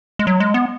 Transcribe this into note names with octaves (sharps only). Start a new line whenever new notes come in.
G#3
F#3
G#3
B3